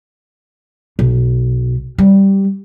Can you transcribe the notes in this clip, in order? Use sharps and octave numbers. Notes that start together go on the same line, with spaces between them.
B1
G3